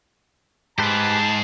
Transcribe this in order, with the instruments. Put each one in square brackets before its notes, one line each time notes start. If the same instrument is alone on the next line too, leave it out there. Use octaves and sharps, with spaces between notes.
[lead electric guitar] G#2 [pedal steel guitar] G4 B4 [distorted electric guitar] G#4 C5 [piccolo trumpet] A5